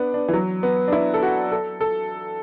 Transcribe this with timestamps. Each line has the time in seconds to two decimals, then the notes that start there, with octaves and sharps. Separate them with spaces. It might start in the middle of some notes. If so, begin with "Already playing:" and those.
Already playing: B3 D4
0.14 D4
0.28 E3
0.33 F#3
0.63 B3
0.88 D4
0.92 E4
1.14 A4
1.23 F#4
1.52 A4
1.81 A4